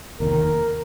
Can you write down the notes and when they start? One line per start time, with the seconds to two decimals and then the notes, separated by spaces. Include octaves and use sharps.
0.20 F1 D#2 D#3 A#4